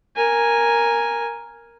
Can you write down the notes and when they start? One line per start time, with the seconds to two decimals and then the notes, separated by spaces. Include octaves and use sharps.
0.16 A#4 G#5